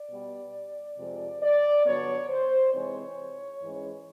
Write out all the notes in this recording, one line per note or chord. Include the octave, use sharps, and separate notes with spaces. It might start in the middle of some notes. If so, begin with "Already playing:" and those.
Already playing: D5
B2 G3 B3
F2 C3 F3 G#3
D5
G2 D3 F#3 B3 D4 C#5
C5
C3 E3 G#3 C4 D#4 C#5
G#2 E3 G#3 C#4